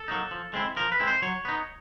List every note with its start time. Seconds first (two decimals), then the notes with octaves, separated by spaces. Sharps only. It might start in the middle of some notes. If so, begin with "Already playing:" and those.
Already playing: A4
0.08 F#3 A#3 D#4
0.31 F3
0.54 G#3 C4 E4
0.77 F3 A#4
0.92 B4
1.00 G#3 C4 E4
1.07 C5
1.22 F#3 C#5
1.45 B3 D#4